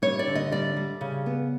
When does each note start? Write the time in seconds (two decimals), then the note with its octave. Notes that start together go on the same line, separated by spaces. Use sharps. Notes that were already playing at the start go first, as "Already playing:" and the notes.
0.02 G3 C#5
0.19 D5
0.27 D3
0.35 D#5
0.51 G3 D5
0.77 G3
1.01 C#3
1.26 B3